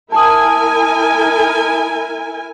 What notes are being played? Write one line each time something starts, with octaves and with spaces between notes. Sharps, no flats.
E4 A#4 G#5 A5 D#6